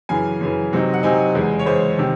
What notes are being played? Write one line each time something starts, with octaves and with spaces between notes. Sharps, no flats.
F#2 C#3 E3 G#5
F#2 C#3 E3
C3 F#3 C4 D#4
F#5
C3 F#3 C4 D#4 G#5
E2 C#3 G#3
C#5
E2 C#3 G#3 C5
C3 D#3